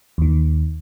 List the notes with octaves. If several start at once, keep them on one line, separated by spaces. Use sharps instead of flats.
D#2 D#3